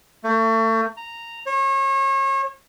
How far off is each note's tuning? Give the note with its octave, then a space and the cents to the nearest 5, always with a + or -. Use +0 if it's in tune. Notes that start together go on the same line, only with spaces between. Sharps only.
A3 +35
A#5 -10
C#5 -35